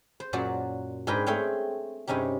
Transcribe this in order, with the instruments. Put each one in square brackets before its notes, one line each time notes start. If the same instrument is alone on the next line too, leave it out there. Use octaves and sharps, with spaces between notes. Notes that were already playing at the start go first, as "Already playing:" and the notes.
[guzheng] C5
F#2 A#2 F#3 F#4 D5 A5
G#2 D4 G#4 A#4 B4 G5
A3 C4 G#4 C#5 F5 G5
G2 C3 C#4 D#4 G4